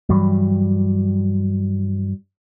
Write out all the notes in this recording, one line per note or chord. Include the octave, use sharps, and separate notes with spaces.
G2 E3 F#3 G3